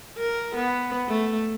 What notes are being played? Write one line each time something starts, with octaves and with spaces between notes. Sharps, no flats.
A#4
B3
A3